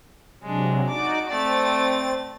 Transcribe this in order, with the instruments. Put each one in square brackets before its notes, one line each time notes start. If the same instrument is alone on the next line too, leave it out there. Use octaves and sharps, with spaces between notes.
[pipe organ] C3 F#3 [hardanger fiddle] G#3 D4
[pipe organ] D#4 F#4 D5 [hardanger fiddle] D6
[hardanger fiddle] A3 D5 [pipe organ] C4 A6